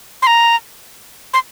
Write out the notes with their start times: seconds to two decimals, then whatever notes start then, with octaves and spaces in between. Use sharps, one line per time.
0.22 C6
0.27 A#5
1.34 C6